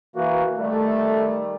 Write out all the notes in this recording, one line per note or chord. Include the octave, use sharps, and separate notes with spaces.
E3 A#3 F#4
D#3 G3 A3